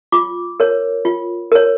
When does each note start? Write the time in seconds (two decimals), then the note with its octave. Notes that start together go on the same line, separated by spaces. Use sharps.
0.12 F4 D6
0.60 A#4 C#5
1.05 F4
1.52 A#4 C#5